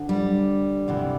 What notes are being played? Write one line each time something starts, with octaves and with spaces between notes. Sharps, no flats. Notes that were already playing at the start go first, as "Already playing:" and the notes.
Already playing: D2 D3
G3
D2 C3 E3